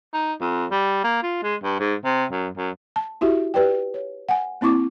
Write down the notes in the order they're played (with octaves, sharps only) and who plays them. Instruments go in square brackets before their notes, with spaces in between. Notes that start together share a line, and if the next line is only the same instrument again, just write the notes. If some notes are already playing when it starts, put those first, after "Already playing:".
[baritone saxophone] D#4
F2
G3
A#3
F4
G#3
G2
G#2
C3
F#2
F#2
[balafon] A5
E4 F#4 G4 E5
G4 B4 D5 G5
C#5
F#5 G#5
A#3 C4 E4 C#6 D6